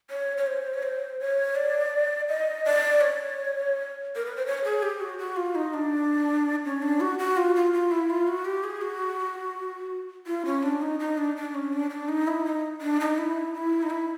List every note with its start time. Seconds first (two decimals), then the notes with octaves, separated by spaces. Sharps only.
0.10 C#5
0.37 C#5
0.47 C5
0.74 C#5
0.83 C5
1.20 C#5
1.56 D5
2.29 D#5
2.65 D5
3.01 C#5
4.16 A#4
4.26 B4
4.36 C5
4.46 C#5
4.64 G#4
4.83 G4
5.01 F#4
5.19 F#4
5.37 F4
5.55 D#4
5.74 D4
6.65 C#4
6.82 D4
7.00 F#4
7.19 F#4
7.37 F4
7.56 F4
7.73 F4
7.91 E4
8.10 F4
8.28 F#4
8.45 G4
8.64 G#4
8.81 F#4
10.27 F4
10.45 C#4
10.63 D4
10.82 D#4
11.00 D#4
11.18 D4
11.36 D4
11.54 C#4
11.73 D4
11.90 D4
12.09 D#4
12.28 E4
12.45 D#4
12.81 D4
13.00 D#4
13.18 E4
13.54 E4
13.83 D#4
13.90 E4